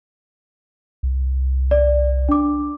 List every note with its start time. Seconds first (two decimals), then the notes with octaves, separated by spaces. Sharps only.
1.03 C2
1.71 D5
2.29 D4 D6